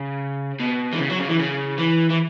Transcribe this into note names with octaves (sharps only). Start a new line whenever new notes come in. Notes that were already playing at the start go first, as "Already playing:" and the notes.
Already playing: C#3
B2
E3
C#3
F#3
C#3
E3
C#3
E3
E3